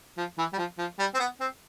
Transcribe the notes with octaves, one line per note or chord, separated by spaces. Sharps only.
F3
E3
G3
F3
F3
G3
C4
B3
C4